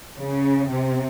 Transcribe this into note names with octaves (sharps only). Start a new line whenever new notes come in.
C#3
C3